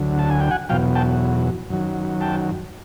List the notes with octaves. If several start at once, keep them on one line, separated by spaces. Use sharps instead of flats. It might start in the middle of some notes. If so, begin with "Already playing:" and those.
Already playing: D2 D3 F#3
A5
G#5
G5
F#5 G#5
E2 B2 F#3 F5 G5
G5 A5
F#2 D#3 F#3
G5 A5